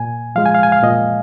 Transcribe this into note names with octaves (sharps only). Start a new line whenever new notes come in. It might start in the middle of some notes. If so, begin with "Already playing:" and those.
Already playing: A#2 G#5
F3 G#3 F5
G#5
F5
G#5
F5
A#2 D#5